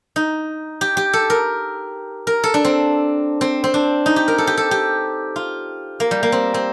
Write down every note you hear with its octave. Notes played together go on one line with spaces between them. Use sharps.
D#4
G4
G4
A4
A#4
A#4
A4
D4
C4
C4
C4
D4
D#4
G4
A#4
A4
G4
A4
G4
F4
A#3
G3
A#3
C4
C4